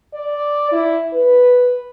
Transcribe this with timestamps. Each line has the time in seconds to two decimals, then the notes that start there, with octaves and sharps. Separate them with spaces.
0.14 D5
0.72 E4
1.13 B4